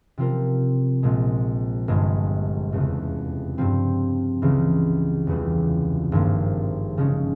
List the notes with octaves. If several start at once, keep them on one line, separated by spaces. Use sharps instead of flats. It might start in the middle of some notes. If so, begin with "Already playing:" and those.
C3 F3 C4 F4 A#4
A#1 A#2 G#3
G1 G2 F3 G#3
F1 E2 C#3
G2 F3 C4
C#2 C#3 E3
F1 E2 C#3 E3 G3
G#1 G2 F3 A#3
C#3 F3 G#3 C#4